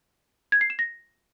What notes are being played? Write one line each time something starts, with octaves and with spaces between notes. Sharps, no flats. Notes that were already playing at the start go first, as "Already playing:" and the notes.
G#6
C7
E7
A#6